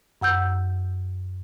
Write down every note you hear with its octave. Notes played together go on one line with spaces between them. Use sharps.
F#2 F#5 E6 G6